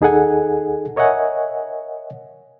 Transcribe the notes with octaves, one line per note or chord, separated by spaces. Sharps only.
D#2 D#4 G#4 A4 F#5 G#5
A#4 C#5 D#5 E5 F#5 G#5